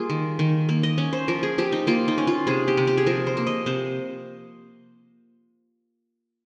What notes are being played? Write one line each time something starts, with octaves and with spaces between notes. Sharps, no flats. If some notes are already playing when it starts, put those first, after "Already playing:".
Already playing: G3 A#3 F4 G#4
D#3
D#3
A#3
D#5
C#4
C5
F3 A#4
G#4
F3 G4
D#4
A#3 F4
D#4
C#4
F4
C3 G#4
G4
C3
G4
G#4
F3 A#4
C5
A#3
D#5
C3 C5